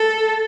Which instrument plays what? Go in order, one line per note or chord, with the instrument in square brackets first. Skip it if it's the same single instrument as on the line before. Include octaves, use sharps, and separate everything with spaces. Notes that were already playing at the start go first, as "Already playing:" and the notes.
Already playing: [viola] A4